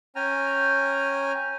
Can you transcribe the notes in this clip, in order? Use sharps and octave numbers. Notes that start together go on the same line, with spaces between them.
C#4 G5 G#5 A#5 F6